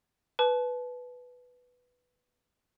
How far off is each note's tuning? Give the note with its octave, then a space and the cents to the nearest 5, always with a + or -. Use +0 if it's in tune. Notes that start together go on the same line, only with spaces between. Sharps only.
B4 +0 A5 -30